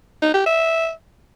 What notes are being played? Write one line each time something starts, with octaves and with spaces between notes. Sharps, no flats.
D#4
G4
E5